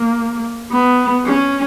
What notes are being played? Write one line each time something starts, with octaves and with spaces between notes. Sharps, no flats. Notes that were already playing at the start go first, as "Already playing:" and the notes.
Already playing: A#3
B3
C#4